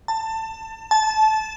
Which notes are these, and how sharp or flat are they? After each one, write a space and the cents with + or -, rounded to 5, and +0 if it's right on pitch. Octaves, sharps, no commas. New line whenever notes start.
A5 +20
A5 -20